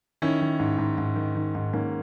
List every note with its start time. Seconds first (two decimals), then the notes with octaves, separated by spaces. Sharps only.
0.22 D#3 C#4 E4
0.41 D#3
0.60 G#2
0.79 G#2
0.98 G#2
1.16 D#3
1.36 D#3
1.55 G#2
1.73 G#2 A#3 C#4